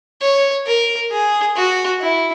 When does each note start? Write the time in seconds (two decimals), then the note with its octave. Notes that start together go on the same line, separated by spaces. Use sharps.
0.21 C#5
0.67 A#4
1.11 G#4
1.56 F#4
2.01 E4